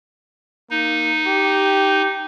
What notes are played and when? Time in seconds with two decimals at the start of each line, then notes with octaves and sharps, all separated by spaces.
0.70 A#3 D#4
1.27 G4